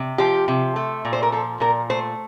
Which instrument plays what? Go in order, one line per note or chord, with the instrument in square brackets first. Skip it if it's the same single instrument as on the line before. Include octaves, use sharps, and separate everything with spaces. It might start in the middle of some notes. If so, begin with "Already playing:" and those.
Already playing: [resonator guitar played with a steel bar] C3
F3 G4
C3
A3
A#2
C5
A#4
F3 A4
A#2 A#4
A3 C5